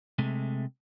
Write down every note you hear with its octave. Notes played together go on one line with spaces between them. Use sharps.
C3 G#3 A3